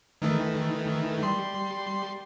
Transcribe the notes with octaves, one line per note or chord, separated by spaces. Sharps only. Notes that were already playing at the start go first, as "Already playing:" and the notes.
D#3 E3 A3
G3 C6